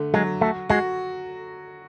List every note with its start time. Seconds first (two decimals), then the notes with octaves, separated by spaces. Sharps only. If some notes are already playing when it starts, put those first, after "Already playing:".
Already playing: D3 A3
0.14 F#3 G#3
0.41 A3 F#4
0.70 G#3 F#4